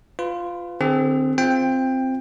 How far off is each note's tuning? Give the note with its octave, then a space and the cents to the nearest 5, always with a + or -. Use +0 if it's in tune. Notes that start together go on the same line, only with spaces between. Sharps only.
F4 +0 B4 +30
D3 +40 C4 +0 G#4 +0
C4 +0 F4 +0 G5 +15